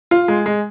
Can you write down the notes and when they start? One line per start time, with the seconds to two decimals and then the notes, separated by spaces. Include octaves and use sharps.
0.11 F4
0.28 G#3
0.46 G#3